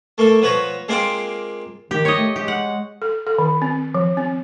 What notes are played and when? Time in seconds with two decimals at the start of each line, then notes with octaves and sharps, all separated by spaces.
0.18 A3 A#3 A4
0.42 F3 B3 B4 C#5 A#5
0.89 G#3 A#3 C4 F4 F5 D6
1.91 D#3 G4
2.05 C#5 D#5
2.18 A3
2.36 G#3 G4
2.48 F#5
3.02 A4
3.27 A4
3.38 D#3
3.62 C4
3.94 F3
4.17 C4